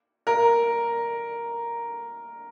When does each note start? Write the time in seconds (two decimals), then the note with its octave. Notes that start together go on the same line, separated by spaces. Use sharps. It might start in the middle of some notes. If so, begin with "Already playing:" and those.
0.27 A#4